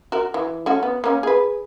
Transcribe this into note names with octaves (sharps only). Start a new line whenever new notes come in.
F#4 A#4
E3
A3 C#4 F#4
B3
A#3 C#4
G#4 B4